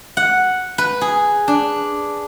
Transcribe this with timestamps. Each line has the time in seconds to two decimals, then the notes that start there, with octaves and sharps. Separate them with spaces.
0.17 F#5
0.78 B4
1.01 G#4
1.48 D4